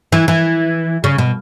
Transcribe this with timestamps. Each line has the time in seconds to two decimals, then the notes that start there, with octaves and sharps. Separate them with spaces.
0.12 E3
0.28 E3
1.04 C#3
1.18 B2